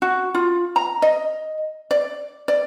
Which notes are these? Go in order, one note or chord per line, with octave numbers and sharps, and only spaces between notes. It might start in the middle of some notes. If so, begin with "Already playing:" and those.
F#4
F4
A#5
D#5
D5
D5